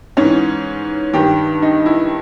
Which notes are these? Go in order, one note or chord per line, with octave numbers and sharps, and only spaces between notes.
G#2 E3 C#4
G2 D#3 G4
D#4
E4